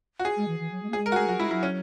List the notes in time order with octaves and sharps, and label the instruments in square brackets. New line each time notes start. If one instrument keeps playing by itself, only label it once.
[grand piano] F#4
G#4
[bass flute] G#3
E3
E3
F#3
G#3
A#3
[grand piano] G#4
[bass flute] G#3
[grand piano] A#4
F#4
G#4
[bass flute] G#3
[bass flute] F#3 [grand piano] F#4
[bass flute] G#3 [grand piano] E4
[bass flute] F#3 [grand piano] E4
[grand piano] C#4